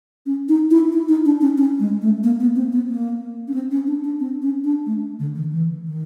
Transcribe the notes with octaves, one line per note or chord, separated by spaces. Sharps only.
C#4
D#4
E4
E4
D#4
D4
C#4
C#4
G#3
A3
A#3
B3
C4
B3
A#3
C#4
C4
C#4
D4
D4
C4
C#4
D4
A3
D3
D#3
E3
D#3